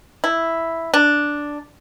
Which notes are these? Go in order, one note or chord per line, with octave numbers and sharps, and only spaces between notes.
E4
D4